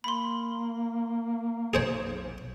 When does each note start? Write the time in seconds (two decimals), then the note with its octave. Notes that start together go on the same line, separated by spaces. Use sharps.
0.04 A#3 B5 C6
1.74 B1 G#4 C5 C#5